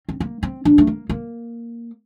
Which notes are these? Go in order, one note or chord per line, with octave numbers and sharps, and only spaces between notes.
C4
A#3
C4
D4
A3
A#3
A#3